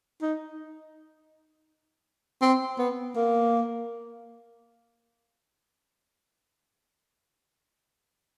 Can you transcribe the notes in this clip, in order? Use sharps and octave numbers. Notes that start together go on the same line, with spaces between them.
D#4
C4
B3
A#3